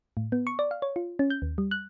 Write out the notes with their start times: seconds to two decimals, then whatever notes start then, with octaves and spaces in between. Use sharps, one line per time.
0.17 A2
0.32 B3
0.47 C#6
0.59 D5
0.71 F5
0.82 C#5
0.96 F4
1.19 C#4
1.30 G6
1.42 D#2
1.58 G3
1.71 F#6